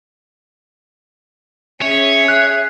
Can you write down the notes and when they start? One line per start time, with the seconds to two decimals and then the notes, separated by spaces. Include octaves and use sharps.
1.82 C#4 G#4 C#5 E5
2.28 G#4 F#6 C7